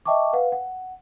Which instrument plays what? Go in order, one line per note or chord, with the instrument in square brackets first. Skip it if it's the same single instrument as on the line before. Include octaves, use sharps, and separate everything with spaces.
[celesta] D#5 E5 G5 A5 C#6 D6
B4 F5 F#5
F#5